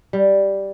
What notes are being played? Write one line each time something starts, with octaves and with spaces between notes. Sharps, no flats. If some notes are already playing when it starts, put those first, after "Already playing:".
G3